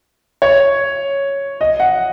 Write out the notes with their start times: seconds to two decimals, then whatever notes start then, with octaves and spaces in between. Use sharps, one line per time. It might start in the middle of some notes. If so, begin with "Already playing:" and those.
0.42 C#5
1.61 D#5
1.80 F#5